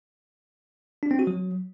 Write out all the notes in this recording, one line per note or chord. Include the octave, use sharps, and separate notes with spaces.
D4
C4
F#4
F#3